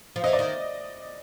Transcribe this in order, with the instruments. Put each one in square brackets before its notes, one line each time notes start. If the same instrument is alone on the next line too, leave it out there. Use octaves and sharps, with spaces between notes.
[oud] F3
[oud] E3 [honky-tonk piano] D#5
[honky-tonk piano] D5
[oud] D#3